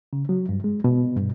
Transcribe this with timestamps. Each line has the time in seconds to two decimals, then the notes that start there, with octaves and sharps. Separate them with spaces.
0.13 C#3
0.29 F#3
0.49 G2
0.64 G#3
0.84 B2
1.17 G2